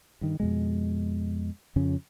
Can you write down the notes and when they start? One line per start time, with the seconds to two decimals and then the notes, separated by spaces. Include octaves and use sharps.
0.21 G2 D#3
0.40 F2 B2 G#3
1.76 F2 C#3 F3 C#4